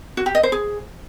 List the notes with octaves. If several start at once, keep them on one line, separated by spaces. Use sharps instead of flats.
F#4
G4
D#5
C5
G#4